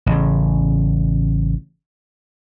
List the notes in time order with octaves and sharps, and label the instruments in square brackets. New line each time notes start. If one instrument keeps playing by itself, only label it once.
[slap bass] A1 C#3